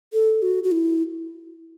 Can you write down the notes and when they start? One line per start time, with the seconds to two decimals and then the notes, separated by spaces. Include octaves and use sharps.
0.13 A4
0.42 F#4
0.64 F#4
0.72 E4